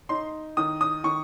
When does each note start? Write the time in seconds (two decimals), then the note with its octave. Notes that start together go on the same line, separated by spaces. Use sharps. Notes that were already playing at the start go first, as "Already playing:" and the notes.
0.09 D#4 C6
0.57 D#3 D#6
0.81 D#6
1.04 D#3 C#6